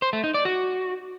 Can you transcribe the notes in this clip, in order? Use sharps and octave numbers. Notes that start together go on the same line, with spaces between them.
C5
A3
D#4
D5
F#4